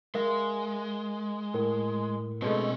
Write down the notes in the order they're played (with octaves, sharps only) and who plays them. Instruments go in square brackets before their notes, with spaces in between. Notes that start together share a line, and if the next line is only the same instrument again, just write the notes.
[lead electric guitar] G#3 [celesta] A#4 E5 F5
[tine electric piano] A2 [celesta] A#4
[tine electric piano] B2 G#3 A3 [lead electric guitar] C4 C#5